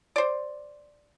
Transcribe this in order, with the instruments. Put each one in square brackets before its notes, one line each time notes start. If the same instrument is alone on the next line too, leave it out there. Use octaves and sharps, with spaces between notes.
[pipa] C5 D5